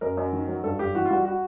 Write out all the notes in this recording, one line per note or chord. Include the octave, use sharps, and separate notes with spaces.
F#2 A#4
F#2
D#3
F#3
G2 A4
G2 G4
E3 F#4
F4
G3 F#4
F#4